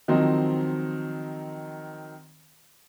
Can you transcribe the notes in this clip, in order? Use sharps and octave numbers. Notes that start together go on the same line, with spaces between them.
D#3 F3 F#3 C4 D#5